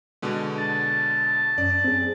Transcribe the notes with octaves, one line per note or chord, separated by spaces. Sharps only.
B2 D3 G#3
A5
F#2 C#4 D5
C4 G#4